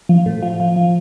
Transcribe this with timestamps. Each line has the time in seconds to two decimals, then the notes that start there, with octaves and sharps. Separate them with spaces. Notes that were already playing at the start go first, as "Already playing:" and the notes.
0.09 F3
0.26 A2
0.42 F3
0.60 F3
0.76 F3